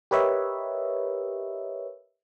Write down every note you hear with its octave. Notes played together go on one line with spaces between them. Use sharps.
G4 A#4 B4 C#5 D#5 E5